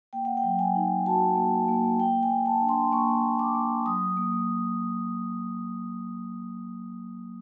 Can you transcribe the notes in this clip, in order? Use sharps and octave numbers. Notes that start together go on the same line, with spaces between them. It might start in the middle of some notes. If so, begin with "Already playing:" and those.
A#3 G5
F#5
G5
F#3
G#5
D#4
F#4 A5
A#3
A#3
A#3 G5
G#5
A#3
A5
D4
C6
A#3 C#6
A#3
D6
A#3
F#3 D#6
A#3